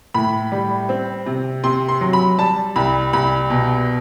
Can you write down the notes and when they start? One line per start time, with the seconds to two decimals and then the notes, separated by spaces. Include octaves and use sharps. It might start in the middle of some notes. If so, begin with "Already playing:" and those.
0.14 A2 B5
0.52 G3
0.89 C4
1.26 C3
1.64 C3 C6
1.88 C6
2.01 F#3
2.13 B5
2.38 G3 A5
2.76 C2 B5
3.13 C2 B5
3.50 B2